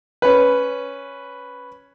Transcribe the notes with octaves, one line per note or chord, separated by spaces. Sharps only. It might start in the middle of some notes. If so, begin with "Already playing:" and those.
C#4 B4